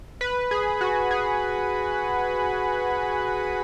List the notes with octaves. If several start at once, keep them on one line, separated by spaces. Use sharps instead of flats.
B4
G#4
F#4
G#4